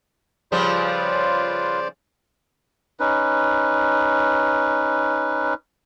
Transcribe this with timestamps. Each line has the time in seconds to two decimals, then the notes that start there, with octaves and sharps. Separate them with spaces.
0.52 C#3 F3 G3 F4 B4 C5 D5
3.00 C#4 D#4 B4